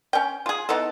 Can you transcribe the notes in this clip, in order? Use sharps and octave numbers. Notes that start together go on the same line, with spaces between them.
C#4 G5
F4 G#4
B3 D#4 E4 A4